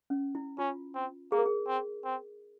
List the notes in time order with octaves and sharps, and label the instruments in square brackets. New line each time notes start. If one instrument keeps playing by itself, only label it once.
[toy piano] C#4
E4
[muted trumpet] C#4 [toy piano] F4
[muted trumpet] C4
[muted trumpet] A#3 [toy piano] G#4
[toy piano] A#4
G#4
[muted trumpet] C4
C4